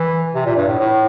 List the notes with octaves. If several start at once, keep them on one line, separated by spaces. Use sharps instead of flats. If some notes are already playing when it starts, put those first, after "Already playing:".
Already playing: E3
C3
A#2
G2
A2
A2